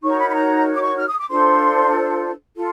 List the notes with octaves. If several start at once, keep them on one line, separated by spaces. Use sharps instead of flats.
D#4 F#4 A#4 C#5 C#6
A#5
B5
B5
A#5
D6
C#6
F6
D#6
D6
D4 F4 A4 C5 C6
F4 A4